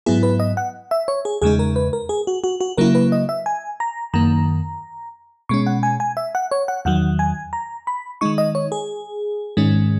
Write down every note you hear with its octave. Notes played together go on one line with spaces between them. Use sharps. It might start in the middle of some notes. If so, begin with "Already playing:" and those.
G#2 F#3 B3 E4 G#4
B4
D#5
F#5
E5
C#5
G#4
E2 C#3 G#3 D#4 G#4
A#4
B4
A#4
G#4
F#4
F#4
F#4
C#3 F#3 A#3 E4 A#4
B4
D#5
E5
G#5
A#5
F#2 D#3 A#3 A#5
B2 G#3 C#4 C#6
F#5
G#5
G#5
E5
F#5
C#5
F#5
E2 D#3 F#3 F#5
G#5
A#5
B5
D#3 G#3 D#4 C#6
D#5
C#5
G#4
G#2 D#3 G#3 C#4